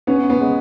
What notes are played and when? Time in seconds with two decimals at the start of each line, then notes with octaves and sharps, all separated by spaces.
0.07 B3 C#4
0.30 B3
0.41 G#3